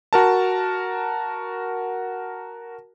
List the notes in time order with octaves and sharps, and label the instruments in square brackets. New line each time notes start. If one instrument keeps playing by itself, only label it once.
[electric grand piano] F#4 A#4 A5